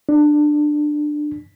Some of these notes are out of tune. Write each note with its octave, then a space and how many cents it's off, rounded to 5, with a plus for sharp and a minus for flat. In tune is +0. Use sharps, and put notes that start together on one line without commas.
D4 +20